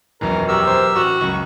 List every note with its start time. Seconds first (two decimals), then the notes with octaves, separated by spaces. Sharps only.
0.21 E1 A#1 F#2 A#4
0.48 F#4 G4 A#4 E6
0.66 C5
0.95 A1 F#4 E7
1.21 C#2 F#2 C#6